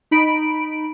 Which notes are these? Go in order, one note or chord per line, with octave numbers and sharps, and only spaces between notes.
D#4 B5 D7